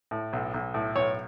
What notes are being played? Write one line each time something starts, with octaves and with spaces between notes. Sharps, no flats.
A2
B1
B1
A2
B1 C#5